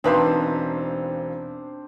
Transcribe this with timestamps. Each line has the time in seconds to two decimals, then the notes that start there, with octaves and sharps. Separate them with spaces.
0.04 E1 C4 D4 D#4 B4 C5 F5